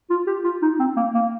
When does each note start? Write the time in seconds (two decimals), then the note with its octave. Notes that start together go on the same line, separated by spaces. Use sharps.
0.10 F4
0.27 G4
0.44 F4
0.62 D#4
0.80 C4
0.96 A#3
1.14 A#3